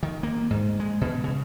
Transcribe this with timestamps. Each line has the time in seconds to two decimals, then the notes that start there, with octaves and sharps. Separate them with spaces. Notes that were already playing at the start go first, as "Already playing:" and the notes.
0.03 D#3
0.23 A#3
0.51 G#2
0.80 G#3
1.01 B2
1.24 C#3